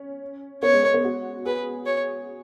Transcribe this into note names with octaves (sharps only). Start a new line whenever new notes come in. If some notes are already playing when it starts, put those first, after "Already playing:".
Already playing: C#4
B3 C#5
G#3
B3
B3
F#4
G#4 B4
C#5